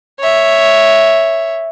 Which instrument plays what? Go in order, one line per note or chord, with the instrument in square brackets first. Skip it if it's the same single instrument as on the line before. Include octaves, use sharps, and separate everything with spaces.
[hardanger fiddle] C#5 E5